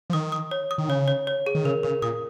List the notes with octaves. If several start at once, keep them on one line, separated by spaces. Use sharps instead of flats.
F3
D#3 D#6
D#6
C#5
D#6
D#3
C#3 C#5
C#5
C#5
G#4
D#3
C#3 A#4
C#3 A#4
A#2 D#6